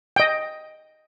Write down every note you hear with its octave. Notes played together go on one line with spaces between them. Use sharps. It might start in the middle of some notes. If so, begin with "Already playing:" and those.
D#5 G5